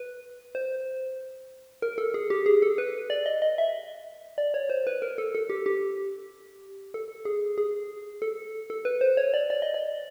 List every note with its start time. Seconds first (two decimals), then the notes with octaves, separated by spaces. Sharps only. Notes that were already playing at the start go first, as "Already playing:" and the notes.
Already playing: B4
0.55 C5
1.82 A#4
1.98 A4
2.14 G#4
2.30 G4
2.46 G#4
2.62 A4
2.78 B4
3.10 D5
3.26 D#5
3.42 D#5
3.58 E5
4.38 D5
4.54 C#5
4.70 C5
4.87 B4
5.02 A#4
5.18 A4
5.35 A4
5.49 G4
5.66 G4
6.94 A4
7.25 G#4
7.58 G#4
8.22 A4
8.70 A4
8.85 B4
9.01 C5
9.17 C#5
9.34 D5
9.50 D5
9.62 D#5
9.74 D5